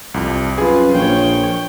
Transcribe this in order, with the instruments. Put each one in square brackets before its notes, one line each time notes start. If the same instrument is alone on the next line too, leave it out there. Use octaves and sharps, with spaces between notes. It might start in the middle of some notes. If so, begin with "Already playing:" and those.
[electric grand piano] C2 F2
[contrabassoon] F#2 [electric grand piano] F4 G#4 [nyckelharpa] B4
[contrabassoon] A#1 [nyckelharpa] C#5 G5